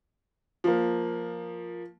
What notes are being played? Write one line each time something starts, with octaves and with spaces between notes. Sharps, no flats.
F3 A#3